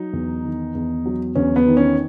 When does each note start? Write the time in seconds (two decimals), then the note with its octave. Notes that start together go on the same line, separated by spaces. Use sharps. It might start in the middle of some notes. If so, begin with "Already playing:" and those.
Already playing: F#3 D#4
0.13 E2
0.44 D#3
0.75 E2
1.06 F#3
1.35 E2 C#4
1.56 B3
1.66 D#3
1.77 C#4